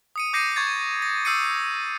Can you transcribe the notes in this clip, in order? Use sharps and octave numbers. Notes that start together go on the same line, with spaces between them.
D#6 C#7 D#7
D6 G6 A#6 C7 C#7 D#7
C#6 G#6 A6
A#6
D#6 E6 G6 C7 C#7 D#7